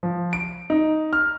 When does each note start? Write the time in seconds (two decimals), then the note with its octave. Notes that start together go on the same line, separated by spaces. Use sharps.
0.03 F3
0.33 D7
0.70 D#4
1.13 F6